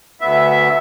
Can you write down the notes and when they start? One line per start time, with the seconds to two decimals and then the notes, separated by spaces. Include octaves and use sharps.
0.21 D2 B3 E5